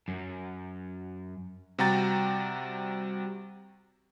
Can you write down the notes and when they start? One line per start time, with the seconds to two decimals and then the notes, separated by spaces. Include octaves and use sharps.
0.08 F#2
1.79 C3 G3 F#4 G5 A#5 A6